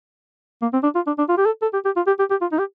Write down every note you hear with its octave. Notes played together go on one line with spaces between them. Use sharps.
A#3
C4
D4
F4
D4
D4
F4
G4
A4
A4
G4
G4
F4
G4
G4
G4
F4
D#4
G4